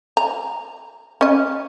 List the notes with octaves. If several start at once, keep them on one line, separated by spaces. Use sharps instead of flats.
A#5
C#4 D#5